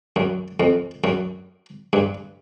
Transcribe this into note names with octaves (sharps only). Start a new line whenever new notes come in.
F#2
F2
F#2
G2